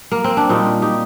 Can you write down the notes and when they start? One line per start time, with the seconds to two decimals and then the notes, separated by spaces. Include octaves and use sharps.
0.12 A#3
0.24 C4
0.37 D4
0.49 A#2 G3 C4 D#4
0.82 D#4 G4